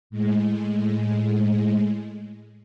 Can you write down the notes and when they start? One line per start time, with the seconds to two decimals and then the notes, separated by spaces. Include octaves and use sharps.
0.10 A2 G#3